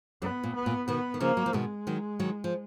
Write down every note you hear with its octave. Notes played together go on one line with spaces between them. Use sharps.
F#2 B3
A#2
B3
A#2
B2 D#3 B3
D#3
C#3 F3 A#3
F#3
F3
B2 D#3 G#3
D#3 F#3
D#3 F#3
F3